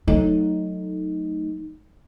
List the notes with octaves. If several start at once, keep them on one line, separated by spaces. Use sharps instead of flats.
F#3 A3 D#4